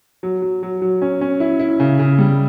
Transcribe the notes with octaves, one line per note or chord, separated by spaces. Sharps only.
F#3
F#3
F#3
F#3
C#4
C#4
E4
E4
C#3
C#3
G3